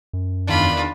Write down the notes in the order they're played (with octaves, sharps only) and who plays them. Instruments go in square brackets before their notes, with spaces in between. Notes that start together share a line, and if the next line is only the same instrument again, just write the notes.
[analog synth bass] F#2
[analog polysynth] E2 D#3 D4 [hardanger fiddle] F4 B5